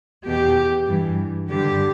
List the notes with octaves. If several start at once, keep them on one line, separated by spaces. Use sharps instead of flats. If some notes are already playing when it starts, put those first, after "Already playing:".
E2 B2 G4
G2 E3
G2 D3 G4